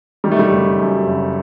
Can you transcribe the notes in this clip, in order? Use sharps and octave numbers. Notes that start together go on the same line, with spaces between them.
D#3 G3
A3
G3
F#1
F#2
F#1